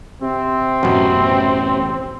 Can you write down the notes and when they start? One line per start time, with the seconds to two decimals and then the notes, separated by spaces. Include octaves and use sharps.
0.22 C3 C4
0.83 A1 F#2 B2